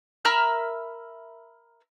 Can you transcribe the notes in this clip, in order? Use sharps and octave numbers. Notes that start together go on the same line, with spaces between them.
A#4 E5 B5 F6